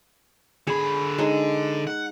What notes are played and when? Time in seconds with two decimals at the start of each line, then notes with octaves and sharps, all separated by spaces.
0.67 D3 G#4 B5
1.18 G#3 D#4
1.87 F#5